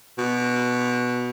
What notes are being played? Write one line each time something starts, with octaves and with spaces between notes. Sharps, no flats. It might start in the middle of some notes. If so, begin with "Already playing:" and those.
B2